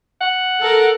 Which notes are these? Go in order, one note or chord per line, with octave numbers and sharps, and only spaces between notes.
F#5
A4 A#4